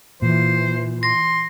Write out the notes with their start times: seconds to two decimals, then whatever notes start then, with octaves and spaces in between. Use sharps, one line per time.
0.22 A#2 E3 C5
1.03 C6 A#6